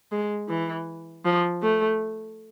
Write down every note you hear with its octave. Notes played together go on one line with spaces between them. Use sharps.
G#3
E3
F3
A3